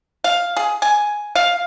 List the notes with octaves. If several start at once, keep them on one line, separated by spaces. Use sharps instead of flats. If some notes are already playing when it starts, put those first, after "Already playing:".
F5
G#4
G#5
F5